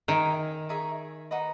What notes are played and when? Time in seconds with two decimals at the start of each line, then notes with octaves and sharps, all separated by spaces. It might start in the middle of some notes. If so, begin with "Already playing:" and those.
0.08 D#3 D#4 A#4 E5 G#5
0.69 D#4 G#4 C#5 E5
1.31 D#4 F#4 B4 D#5